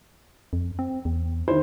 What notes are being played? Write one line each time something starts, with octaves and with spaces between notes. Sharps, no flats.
F2
C4
E2
D#3 E4 C5